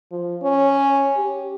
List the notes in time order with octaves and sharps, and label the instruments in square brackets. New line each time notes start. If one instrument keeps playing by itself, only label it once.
[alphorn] F3
C#4
G4